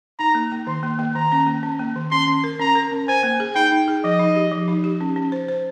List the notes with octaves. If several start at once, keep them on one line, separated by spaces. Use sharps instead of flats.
D#4 A#5
A#3
A#3
D#3 C6
A#3
A#3
D#3 A#5
C#4
A#3
C#4
A#3
D#3
C#4 C6
C#4
A#4
C#4 A#5
A#4
C#4
C5 G#5
A#3
G#4
D#4 G5
D#4
G#4
F3 D#5
D#4
G4
F3
D#4
G4
C#4
C#4
C5
C5